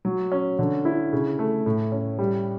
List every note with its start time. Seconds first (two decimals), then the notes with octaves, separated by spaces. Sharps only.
0.05 F#3
0.32 C#4
0.59 D3
0.85 E4
1.13 C#3
1.39 A3
1.66 A2
1.92 C#4
2.19 G3